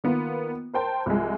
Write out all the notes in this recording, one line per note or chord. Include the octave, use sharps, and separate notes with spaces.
D#3 A#3 B3 F4
A#4 C5 G5 A5
C2 F3 G#3